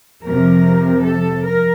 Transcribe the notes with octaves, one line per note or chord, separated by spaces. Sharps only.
F2 C3 F3 A#4
A4
A#4